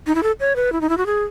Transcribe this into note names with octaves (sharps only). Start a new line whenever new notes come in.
D#4
E4
A4
C#5
B4
E4
D#4
E4
F#4
G#4